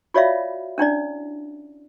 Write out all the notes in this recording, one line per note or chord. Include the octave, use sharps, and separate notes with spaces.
F4 F#4 C#5 D5 E5 F5
C#4 D4 E4 D5